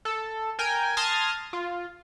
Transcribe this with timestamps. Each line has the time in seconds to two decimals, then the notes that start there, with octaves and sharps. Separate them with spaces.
0.05 A4
0.59 A#4 G5 G#5
0.97 A5 C6 D#6 F6 G#6 A#6
1.53 F4